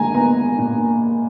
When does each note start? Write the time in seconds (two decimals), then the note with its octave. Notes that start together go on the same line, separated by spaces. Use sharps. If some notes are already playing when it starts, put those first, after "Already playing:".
Already playing: A#2 G#3 G#5 A#5
0.14 B3 A#5
0.58 A#2